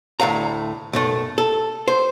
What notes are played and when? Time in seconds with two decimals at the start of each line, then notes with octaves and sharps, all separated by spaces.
0.20 D2 A2 F5 A#5
0.93 B1 F#2 A3
1.38 A4
1.88 C5